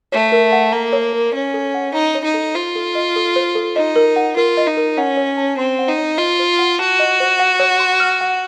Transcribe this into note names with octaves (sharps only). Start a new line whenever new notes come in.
A3 C#5
A#4
F#5
A#3 A#5
C#5
A#4
C#4 C#5
A4
F#5
D#4 A#5
C#5
D#4
A4
F4 C5
A4
D#5
A4
C5
A4
D#4 D#5
A#4
F#5
F4 A#4
D#5
D#4
A#4
C#4 F#5
C#5
A5
C4 C6
F#5
D#4
C#5
F4 D#5
C5
F#5
F#4 A5
D#5
C5
F#5
C#5
C6
F6
F#5